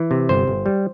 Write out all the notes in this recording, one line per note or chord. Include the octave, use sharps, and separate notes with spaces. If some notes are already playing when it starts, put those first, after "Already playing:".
Already playing: E3
C3
G1 C5
G1
G3